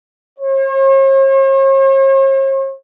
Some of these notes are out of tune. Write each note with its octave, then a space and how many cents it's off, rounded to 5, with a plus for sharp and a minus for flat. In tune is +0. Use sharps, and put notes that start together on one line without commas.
C#5 -45